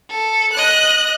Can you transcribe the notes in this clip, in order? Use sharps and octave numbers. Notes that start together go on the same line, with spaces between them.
A4
D#5 F#6